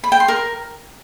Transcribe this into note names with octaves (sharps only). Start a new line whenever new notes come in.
B5
G5
C6
A#4